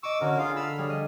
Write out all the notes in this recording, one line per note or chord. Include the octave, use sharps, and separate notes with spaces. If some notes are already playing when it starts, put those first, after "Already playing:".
D#5 C#6 D6 E6
D3 C#4 F#4 A#4
F4 G#4 F5
A4 F5 B5 E6
G3 D4 G#4 C#5
D#5